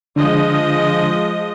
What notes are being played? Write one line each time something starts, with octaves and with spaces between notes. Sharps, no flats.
D3 F3 G#3 D4 D#5